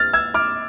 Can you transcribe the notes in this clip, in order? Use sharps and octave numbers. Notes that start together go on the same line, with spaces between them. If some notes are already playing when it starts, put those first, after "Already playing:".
Already playing: F6 A6
E6 G#6
D6 F6